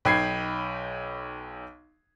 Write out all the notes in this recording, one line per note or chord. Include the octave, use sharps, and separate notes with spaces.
B1 D#4 G5 B5 G#6 C7